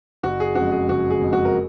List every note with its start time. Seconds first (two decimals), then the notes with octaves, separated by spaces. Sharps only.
0.23 F#1 F#4
0.40 G#4
0.55 F2 C#3 G#3 F#4
0.72 G#4
0.88 F#1 F#4
1.10 G#4
1.21 F2 C#3 G#3
1.33 F#4
1.45 A#4